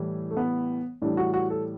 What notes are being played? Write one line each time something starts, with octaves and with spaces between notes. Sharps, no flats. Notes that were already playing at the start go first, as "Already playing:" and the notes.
Already playing: A2 E3 G3
A3
B3
A2 E3 G3 D4
F#4
F#4
A4